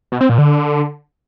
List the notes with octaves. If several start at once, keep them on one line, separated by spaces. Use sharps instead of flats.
B2
C4
A#2
D3